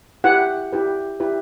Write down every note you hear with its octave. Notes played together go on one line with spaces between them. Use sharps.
E4 G4 B4 F#5
E4 G4 B4
E4 G4 B4